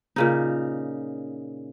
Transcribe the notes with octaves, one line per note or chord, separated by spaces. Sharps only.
A#2 C#3 D#4